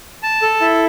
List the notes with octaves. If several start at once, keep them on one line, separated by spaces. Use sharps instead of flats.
A5
A4
E4